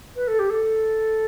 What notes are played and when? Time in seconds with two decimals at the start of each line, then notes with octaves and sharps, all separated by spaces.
0.16 B4
0.28 A4
0.39 G4
0.50 A4